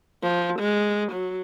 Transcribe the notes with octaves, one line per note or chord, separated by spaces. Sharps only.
F3
G#3
F#3